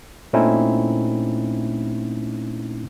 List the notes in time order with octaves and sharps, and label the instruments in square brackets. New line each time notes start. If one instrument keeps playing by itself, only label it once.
[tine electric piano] A#2 A3 C4 C#4 D#4 E4